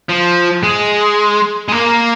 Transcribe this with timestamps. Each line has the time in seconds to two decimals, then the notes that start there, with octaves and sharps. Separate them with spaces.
0.09 F3
0.63 G#3
1.69 G#3
1.72 A#3